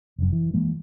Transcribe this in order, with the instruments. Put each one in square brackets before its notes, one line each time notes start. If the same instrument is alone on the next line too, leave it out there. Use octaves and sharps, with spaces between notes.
[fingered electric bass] F1 F#2
E3
E3 G#3 A#3